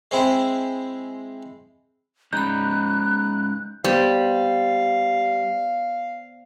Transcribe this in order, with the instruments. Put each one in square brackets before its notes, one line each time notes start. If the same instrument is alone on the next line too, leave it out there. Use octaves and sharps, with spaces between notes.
[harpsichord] G#3 C4 E4
[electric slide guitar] G#3 C#4 D#4 [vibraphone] A#5 B5 [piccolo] F#6 [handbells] G6
[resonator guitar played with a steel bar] G3 [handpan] B3 C5 [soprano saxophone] F5